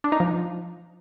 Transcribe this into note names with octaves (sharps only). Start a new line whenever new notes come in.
D4
D#4
F3